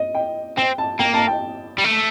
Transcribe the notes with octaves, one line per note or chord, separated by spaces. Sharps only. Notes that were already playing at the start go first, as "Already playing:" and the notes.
Already playing: D#5
G5
C4 G5
A5
A#3 G5
A5
G5
G3
A3